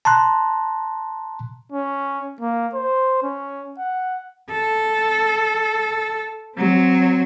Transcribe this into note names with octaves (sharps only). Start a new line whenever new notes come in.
A5 A#5 C6 F#6
C#4
A#3
C5
C#4
F#5
A4
F#3 C4